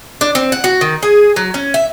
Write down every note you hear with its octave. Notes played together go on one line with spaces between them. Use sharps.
D4
C4
F#5
F#4
D#3
G#4
F#3
C#4
E5